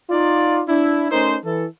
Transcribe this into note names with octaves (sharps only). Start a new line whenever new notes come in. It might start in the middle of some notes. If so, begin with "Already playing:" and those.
D#4 F4 D5
D4 E4
A3 C#4 D#4 A#4 C5
E3 A4